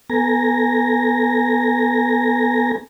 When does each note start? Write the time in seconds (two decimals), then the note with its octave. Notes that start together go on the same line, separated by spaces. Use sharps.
0.10 B3 A4 G#5 A#5 A#6